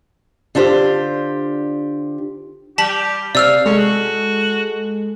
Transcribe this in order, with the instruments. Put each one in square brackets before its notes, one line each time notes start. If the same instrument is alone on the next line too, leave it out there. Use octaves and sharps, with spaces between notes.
[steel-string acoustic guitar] D3 D4 F4 G4 C5
[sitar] G3 [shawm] G4 [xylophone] A5 B6 F#7
[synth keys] C3 [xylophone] D5 E6 F6 [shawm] F5
[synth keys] G#3 [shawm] C#4 [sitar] A4
[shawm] F#4